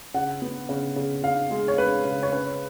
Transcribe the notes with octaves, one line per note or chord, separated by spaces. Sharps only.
C#3 F#5
B3
C#3
C#3
C#3 F5
G#3
C#5
G#3 B4
C#3
C#5
C#4 B4